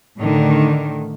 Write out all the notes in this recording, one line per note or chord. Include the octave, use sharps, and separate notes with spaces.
A2 D3 D#3